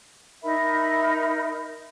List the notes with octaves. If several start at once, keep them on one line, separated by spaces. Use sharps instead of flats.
D#4 A#4 E5 B5